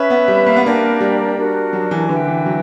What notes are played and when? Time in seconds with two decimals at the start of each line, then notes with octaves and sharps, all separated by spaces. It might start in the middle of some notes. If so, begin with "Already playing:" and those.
Already playing: C#4 B4 E5 B5
0.10 B3
0.28 G3
0.46 A#3
0.56 B3
0.64 A#3 D4 G4 A#4 D5
1.01 G3
1.37 D4 F#4 A#4
1.73 F#3
1.91 E3
2.09 D3 B4 E5 G5
2.28 E3
2.46 F#3